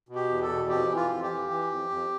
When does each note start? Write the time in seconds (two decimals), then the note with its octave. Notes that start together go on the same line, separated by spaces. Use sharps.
0.09 B2
0.15 G4
0.29 E2
0.42 A4
0.49 B2
0.69 F2 G4
0.89 E3
0.96 F4
1.09 F2
1.23 G4
1.30 E3
1.50 E3
1.71 F2
1.90 F2